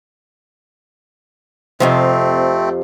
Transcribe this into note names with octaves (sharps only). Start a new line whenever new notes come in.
F2 C3 F3 A3 C4